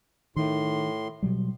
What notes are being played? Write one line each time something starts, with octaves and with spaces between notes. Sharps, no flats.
A2 D#3 C6
B2 F#3 G3